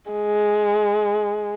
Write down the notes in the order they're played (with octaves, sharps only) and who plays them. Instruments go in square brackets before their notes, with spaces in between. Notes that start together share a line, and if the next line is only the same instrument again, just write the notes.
[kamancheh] G#3